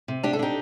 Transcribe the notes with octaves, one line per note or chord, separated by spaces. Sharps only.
C3
D4 G4
A4
D4 D#4 G4